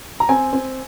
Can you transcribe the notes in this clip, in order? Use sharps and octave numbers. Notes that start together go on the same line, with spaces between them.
A#5
C4 G#5
C4